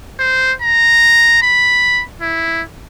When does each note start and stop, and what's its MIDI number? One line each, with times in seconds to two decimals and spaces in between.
0.19 0.53 72
0.62 1.42 82
1.42 2.03 83
2.22 2.62 64